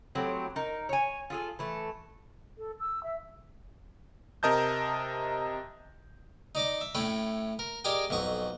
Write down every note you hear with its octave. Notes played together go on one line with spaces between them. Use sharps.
A2 F#3 C4 G4
D#4 A#4
C#5 G#5
F4 G#4 A4
E3 A3
A4
E6
E5
C3 A#4 D#5 A5 G6
D#4 D5 D#5 D6
E5
A2 A3 C#4 G5 B5
A#4
G4 G#4 A#4 D5 D#5 G5
B1 F2 C#6 D#6